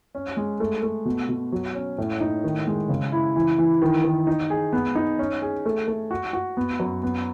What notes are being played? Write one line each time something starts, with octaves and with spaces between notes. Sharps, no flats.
C#4
G#3
A3
A3
B2
B2
F#3
C#4
A2
D#4
D#3
G#3
C#3
E4
E3
E3
D#3
D#3
D#4
G#4
B3
D#4
C#4
G#4
A3
A3
F#4
F#4
B3
F#2
B3